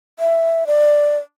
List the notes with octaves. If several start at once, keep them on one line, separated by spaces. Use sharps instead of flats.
E5
D5